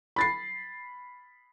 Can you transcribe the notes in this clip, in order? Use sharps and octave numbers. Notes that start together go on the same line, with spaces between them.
B5 A6 C7